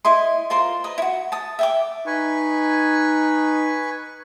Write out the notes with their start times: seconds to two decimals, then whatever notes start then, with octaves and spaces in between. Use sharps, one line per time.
0.05 E4 D#5 C6
0.50 F4 A#4 C5 C6
0.84 B4 D#5
0.98 E4 F#4
1.32 A5 D#6
1.59 E5 G5 D6
2.07 D#4 B4 G#5 C#6